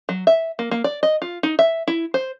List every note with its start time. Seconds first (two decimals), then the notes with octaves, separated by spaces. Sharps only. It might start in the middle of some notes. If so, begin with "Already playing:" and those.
0.09 F#3
0.27 E5
0.59 A#3
0.71 A#3
0.84 D5
1.03 D#5
1.22 F4
1.43 D#4
1.59 E5
1.88 E4
2.14 C5